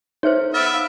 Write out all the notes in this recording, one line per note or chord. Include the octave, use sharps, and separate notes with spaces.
D#4 C5 C#5 E5 F6
B3 E5 F6 A6 D7
F5 E6